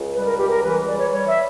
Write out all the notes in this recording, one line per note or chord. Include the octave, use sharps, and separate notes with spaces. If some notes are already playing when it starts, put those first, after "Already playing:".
Already playing: C#2
G3 B4
A#4
C#2 G4
A#4
E3 B4
G3 D5
C#5
G3 C#5
E5